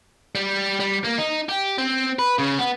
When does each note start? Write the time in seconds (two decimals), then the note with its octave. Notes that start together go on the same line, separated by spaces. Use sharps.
0.35 G3
0.80 G3
1.05 A#3
1.18 D#4
1.49 G4
1.78 C4
2.19 B4
2.38 C#3
2.58 B3